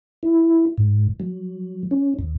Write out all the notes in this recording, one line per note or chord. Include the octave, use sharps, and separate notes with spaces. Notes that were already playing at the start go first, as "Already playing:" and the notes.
E4
G#2
F#3
C#4
D#2